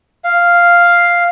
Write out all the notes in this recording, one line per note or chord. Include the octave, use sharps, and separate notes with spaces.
F5